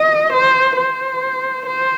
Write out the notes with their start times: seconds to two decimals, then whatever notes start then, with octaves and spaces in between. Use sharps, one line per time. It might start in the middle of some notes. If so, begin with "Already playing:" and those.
Already playing: D#5
0.33 C5
0.77 C5
1.66 C5